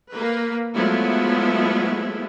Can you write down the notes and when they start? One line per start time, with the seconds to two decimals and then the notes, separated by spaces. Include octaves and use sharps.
0.11 A#3 B4
0.73 F3 F#3 G#3 A3 B3 E4